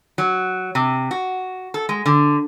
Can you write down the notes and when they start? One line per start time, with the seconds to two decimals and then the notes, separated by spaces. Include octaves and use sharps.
0.18 F#3
0.75 C3
1.11 F#4
1.74 A4
1.89 G#3
2.06 D3